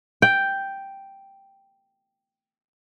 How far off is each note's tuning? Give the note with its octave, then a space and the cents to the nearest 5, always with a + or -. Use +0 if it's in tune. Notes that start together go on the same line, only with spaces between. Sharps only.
G5 +0